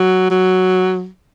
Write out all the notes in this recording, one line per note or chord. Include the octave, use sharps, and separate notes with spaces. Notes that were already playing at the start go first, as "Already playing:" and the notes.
Already playing: F#3
F#3